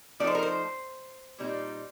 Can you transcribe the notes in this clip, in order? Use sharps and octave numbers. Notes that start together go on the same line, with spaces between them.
F3 A3 C4 D#4 D5
C5
A#4
C5
A#2 G3 C4 D#4